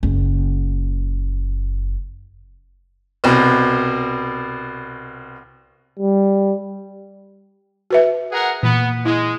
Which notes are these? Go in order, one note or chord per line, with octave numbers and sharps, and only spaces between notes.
F#1 A#3
C2 B2
G3
F#4 B4 E5
G#4 A#4 F#5
A#2 E3 B3
G#3 E4